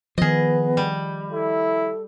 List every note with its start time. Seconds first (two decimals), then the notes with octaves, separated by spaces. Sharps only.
0.18 D#3 F3 B3 G#4 D#5
0.77 G3
1.31 E4 A4